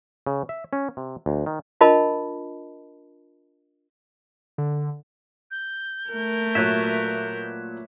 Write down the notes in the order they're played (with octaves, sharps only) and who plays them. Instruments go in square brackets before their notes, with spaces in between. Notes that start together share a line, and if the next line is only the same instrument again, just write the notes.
[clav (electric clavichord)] C#3
E5
C#4
C3
D2
D#3
[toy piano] D4 F4 A#4 D#5 A5 B5
[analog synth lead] D3
[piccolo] G6
[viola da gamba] A3 A#4
[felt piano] A#2 F#3 [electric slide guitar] B4 C#5 E5